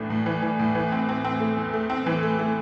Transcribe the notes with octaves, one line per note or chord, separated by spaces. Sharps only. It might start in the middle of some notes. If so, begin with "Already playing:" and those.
Already playing: A2 E3 A3 D4
A2
E3
E3
A2
E3
C4
C4
C4
A3
E2
A3
C4
E3
A3
A3